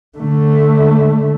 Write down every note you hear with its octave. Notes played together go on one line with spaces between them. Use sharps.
D3 A3